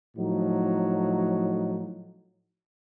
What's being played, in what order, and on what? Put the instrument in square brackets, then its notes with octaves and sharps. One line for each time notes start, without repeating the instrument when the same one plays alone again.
[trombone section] A2 F3 F#3 D#4